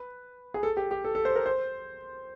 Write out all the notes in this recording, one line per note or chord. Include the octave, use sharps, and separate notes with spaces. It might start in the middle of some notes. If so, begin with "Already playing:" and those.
Already playing: B4
G#4
A4
G4
G4
A4
A4
C5
A#4
C5